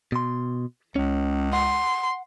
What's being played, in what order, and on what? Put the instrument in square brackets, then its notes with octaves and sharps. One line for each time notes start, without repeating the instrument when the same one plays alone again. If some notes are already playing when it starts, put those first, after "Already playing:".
[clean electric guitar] B2 C6
[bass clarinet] C#2 [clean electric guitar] C#4
[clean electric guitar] F#5 [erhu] C6